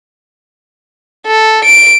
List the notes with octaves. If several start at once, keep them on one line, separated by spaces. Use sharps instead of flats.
A4
D7